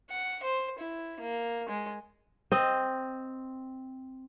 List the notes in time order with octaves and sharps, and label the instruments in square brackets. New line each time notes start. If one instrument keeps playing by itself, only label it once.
[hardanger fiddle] F#5
C5
E4
A#3
G#3
[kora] C4 D#5